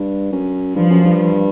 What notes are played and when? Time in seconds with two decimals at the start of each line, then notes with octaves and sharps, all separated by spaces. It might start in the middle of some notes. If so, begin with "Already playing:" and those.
Already playing: G2
0.32 F#2
0.76 G2 F3
0.90 F#2
1.04 G2